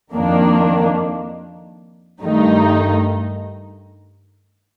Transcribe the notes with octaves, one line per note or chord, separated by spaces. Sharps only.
F2 D#3 A#3 D4
G2 D#3 A3 D#4